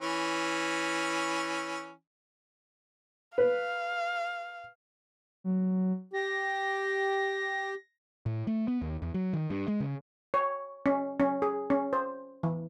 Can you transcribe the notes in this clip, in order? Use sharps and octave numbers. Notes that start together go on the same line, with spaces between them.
E3 C#4
B4 F5
F#3
G4 A#6
A2
A3
B3
D#2
E2
F#3
D#3
G2
G#3
C#3
C#5
C#4
C#4
G#4
C#4
C5
E3